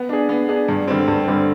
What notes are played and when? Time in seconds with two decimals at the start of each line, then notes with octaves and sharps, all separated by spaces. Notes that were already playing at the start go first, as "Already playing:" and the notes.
Already playing: B3
0.09 D4 G#4
0.29 B3
0.49 D4 G#4
0.68 G2
0.88 D3 G3 C4
1.08 G2
1.28 D3 G3 C4